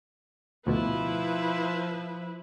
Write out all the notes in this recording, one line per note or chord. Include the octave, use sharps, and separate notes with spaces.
D2 B2 F3 E4 B4